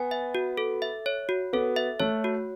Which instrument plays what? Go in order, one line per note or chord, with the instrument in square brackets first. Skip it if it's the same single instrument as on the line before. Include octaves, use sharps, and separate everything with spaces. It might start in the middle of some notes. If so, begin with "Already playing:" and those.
Already playing: [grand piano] B3 [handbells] G#5
[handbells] E5
F#4
A4
E5
C#5
F#4
[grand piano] B3 [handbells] A4
[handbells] E5
[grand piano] A3 [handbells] C#5
[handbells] F#4